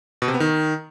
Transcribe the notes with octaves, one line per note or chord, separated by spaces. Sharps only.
B2
C3
B3
D#3